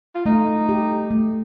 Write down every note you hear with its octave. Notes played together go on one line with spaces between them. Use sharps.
F4
A3 D#4
G4
A3